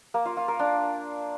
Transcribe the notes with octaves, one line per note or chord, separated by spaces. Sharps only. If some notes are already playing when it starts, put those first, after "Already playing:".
A#3
F4
F4
A#4
D4